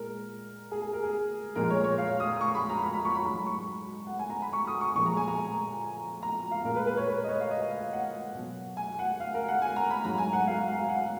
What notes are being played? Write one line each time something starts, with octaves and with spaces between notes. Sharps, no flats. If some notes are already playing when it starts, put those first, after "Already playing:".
Already playing: A#2 G#3 A#4
G#4
G#4
A#4
G#4
A#2 F3 G#3 A#4
C#5
C#5
F5
D#6
C#6
B5
A#5
B5
B5
C#6
B5
G#2 F#3 B5
C#6
F#5
G#5
A#5
B5
C#6
D#6
C#6
A#2 F3 G#3 C#6
A#5
G#5
A#5
A#5
F5
A#2 G#3 A#4
B4
B4
C#5
B4
D#5
C#5
F5
D#5
F5
F#5
B2 F#3
G#5
F#5
F5
A#4
F#5
G#5
A#5
B5
G#2 F#3 A#5
G#5
F#5
F5
F5
F#5